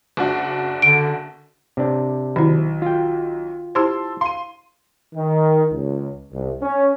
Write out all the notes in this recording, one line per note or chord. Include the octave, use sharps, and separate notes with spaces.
F#1 D4 F#4
D3 D7
C3 D4
B1 D#3 E4
F4 G5
E4 G4 C5 A5 C6 E6
F5 C6 D#7
D#3
C#2
C2
C#4